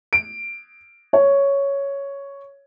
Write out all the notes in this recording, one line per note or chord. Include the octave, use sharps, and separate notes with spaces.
D7
C#5